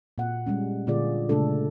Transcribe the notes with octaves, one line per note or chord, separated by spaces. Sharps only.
A#2 F#5
G3 G#3 C#4
A#2 D3 F4 G#4 D5
A#2 C#3 G#3 A3 D4 A4